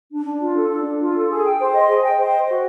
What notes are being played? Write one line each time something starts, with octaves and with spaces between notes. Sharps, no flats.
D4
D4
F4
A4
D4
D4
F4
A4
G#4
G5
C5
D#5
G#4
G5
C5
D#5
F#4